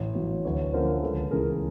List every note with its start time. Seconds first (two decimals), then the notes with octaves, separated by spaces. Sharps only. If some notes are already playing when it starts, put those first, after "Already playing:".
Already playing: A1
0.15 A2 F#3
0.45 D2 B4 C#5
0.73 D3 F3 A#3 C#4 A#4 C5
1.03 C#2 A4 B4
1.31 C#3 E3 A3 C#4 G#4 A#4